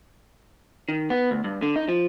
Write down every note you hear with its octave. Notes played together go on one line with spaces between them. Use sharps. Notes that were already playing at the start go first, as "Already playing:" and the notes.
D#3
B3
D2
G2
D3
D#4
F3